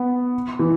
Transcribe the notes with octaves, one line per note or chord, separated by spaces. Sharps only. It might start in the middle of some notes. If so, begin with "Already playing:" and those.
Already playing: B3
E3